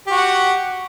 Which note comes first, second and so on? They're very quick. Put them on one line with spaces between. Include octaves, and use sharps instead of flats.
G4 F#4 F#5